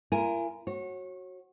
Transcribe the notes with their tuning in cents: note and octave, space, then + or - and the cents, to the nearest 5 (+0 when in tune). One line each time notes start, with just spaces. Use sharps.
E4 +45 A#4 +0 G#5 +0
F#4 +0 C#5 -30